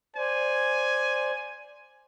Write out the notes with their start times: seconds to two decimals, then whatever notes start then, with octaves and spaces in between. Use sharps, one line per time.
0.16 C5 D5 G#5